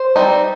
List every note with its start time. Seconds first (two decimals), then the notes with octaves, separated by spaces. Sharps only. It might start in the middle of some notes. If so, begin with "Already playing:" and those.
Already playing: C5
0.16 G3 C4 D#4